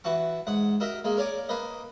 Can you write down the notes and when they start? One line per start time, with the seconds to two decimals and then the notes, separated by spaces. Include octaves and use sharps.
0.04 E3 F#4 A5 C#6
0.47 G#2 F#5
0.80 F#4 A#4 D#5 E5
1.04 G#3 A#3
1.17 A#4 C#5 D5 G#5
1.49 A#3 B4 D#5